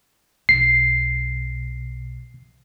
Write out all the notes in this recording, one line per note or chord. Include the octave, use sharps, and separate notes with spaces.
B1 C7